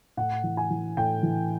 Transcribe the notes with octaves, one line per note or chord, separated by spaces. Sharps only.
A2 F#5
E3
G#5
E3
A2 G5
E3